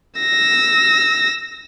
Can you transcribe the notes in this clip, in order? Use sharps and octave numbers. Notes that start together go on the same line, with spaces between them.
E6 A#6